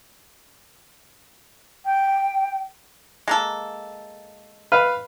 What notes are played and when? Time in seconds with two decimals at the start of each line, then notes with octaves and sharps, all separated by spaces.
1.86 G5
3.28 G#3 A#3 A4
4.72 B4 F5